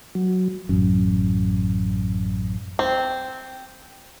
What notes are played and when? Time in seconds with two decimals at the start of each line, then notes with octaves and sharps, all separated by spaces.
0.15 F#3
0.69 A1 F#2
2.79 C4